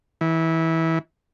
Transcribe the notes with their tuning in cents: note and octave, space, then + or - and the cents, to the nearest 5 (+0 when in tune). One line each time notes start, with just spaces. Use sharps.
E3 -20